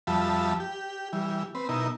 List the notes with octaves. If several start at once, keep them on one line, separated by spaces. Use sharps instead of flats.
F2 F3 G3 E5 A5 B5
G4
E3 G3
C4 B4
B2 D#4 E4 A#4